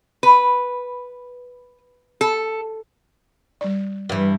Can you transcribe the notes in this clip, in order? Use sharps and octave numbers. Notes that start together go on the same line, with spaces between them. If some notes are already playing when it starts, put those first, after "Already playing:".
B4
A4
G3 D5
G2 E3